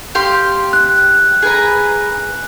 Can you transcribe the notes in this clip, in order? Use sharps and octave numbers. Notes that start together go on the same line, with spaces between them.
G4 F5 C6
F#6
G#4 B4 A#5